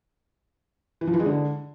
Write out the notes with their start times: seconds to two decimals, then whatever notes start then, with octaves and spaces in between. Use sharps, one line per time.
1.01 E3
1.07 F3
1.14 E3
1.20 G#3
1.26 D3